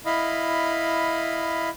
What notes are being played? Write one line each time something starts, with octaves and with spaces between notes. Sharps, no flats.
E4 D#5 F5 B5